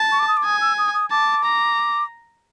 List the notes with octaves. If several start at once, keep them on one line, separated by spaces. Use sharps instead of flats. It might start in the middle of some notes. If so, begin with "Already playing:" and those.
Already playing: A5
C#6
D6
D#6
D6
G#5 D#6
E6
D#6
D#6
A5 D6
A#5